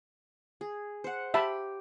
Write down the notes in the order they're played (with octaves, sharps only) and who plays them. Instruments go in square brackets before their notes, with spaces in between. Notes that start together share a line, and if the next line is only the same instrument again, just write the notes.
[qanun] G#4
C5 F#5
[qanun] G4 [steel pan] E5 A5 B5